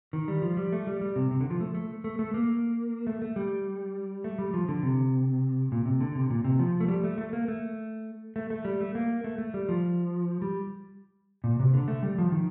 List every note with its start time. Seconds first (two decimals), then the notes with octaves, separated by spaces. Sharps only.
0.13 D#3
0.28 G3
0.42 F3
0.57 G3
0.72 A3
0.87 G3
1.01 G3
1.16 C3
1.31 C3
1.41 D3
1.50 F3
1.61 A3
1.75 A3
2.04 A3
2.19 A3
2.34 A#3
3.07 A3
3.22 A3
3.36 G3
4.24 A3
4.39 G3
4.54 F3
4.69 D3
4.83 C3
5.72 A#2
5.85 C3
6.01 D3
6.15 C3
6.30 A#2
6.44 C3
6.59 F3
6.80 A3
6.88 G3
7.04 A3
7.18 A3
7.33 A#3
7.48 A3
8.36 A3
8.50 A3
8.65 G3
8.80 A3
8.95 A#3
9.24 A3
9.38 A3
9.54 G3
9.69 F3
10.42 G3
11.44 A#2
11.60 C3
11.74 D3
11.88 A3
12.03 G3
12.18 F3
12.32 D#3